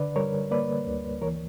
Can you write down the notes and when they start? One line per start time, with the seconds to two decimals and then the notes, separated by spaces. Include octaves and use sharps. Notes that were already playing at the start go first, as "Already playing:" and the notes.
Already playing: D3 B4 D5
0.16 G3 A#4 C#5
0.51 A#3 B4 D5
0.87 D2
1.21 E3 A#4 C#5